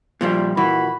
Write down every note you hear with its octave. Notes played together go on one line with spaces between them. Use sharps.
A#2 F3 G3
A#2 E3 F#4 B5